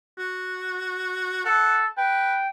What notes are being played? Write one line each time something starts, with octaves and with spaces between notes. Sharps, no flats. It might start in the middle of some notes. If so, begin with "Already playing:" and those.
F#4
A4 F#5
B4 G5